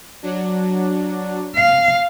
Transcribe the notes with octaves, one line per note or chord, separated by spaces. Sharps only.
F#3 D4
F5